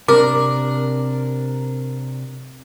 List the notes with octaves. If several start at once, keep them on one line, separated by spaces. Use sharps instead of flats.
C3 D4 A#4 D6